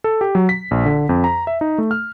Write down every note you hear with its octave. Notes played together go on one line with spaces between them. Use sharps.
A4
G4
F#3
B6
A#1
D3
F2
A#5
E5
D#4
A3
F6